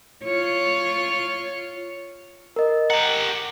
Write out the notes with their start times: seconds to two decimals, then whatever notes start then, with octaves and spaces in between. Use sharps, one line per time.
0.24 F4 C#5
2.56 A#4 D#5
2.90 G4 F#5 A#5